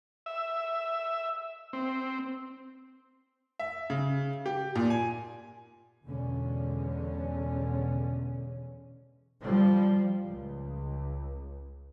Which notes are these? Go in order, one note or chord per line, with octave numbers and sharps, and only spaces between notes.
E5
C4
E5
C#3
G4
A#2
G#5
E2 B2 D3 G#3 C#4
F3 G3
C#2